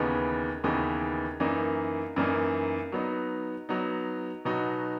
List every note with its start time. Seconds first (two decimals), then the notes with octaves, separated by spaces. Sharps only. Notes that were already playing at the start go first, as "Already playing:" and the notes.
Already playing: D#2 C#3 E3 B3 D#4
0.64 D#2 C#3 E3 B3 D#4
1.40 F#2 E3 A#3 D#4
2.16 F#2 E3 A#3 D#4
2.92 F#3 B3 D#4
3.69 F#3 B3 D#4
4.45 B2 F#3 B3 D#4 F#4